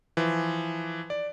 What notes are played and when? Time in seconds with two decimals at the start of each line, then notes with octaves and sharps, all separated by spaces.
0.17 E3 F3
1.10 D5